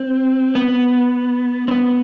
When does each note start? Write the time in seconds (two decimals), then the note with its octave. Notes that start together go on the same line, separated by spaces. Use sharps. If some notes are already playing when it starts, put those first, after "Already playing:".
Already playing: C4
0.55 B3
1.68 C4
1.71 B3